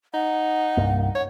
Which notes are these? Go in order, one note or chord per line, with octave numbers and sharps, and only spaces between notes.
D#4 F#5
C2 G2 A#3
C#5